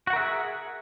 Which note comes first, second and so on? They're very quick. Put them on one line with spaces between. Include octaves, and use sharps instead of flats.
F#4 F#5 A#4 E5 G#4